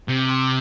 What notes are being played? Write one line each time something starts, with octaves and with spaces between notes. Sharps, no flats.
C3